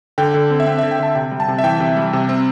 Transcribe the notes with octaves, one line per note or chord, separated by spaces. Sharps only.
D3 G5
D3
C4
E5
C4 G5
E5
D3
G5
D3 A5
C3 G5
G3
A5
C3
E5
E3 G5
C3
G3
C3
C4